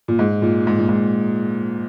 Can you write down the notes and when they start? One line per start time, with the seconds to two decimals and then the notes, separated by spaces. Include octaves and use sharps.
0.08 A#2
0.19 G#2
0.42 A#2
0.67 G#2
0.78 A#2
0.89 G#2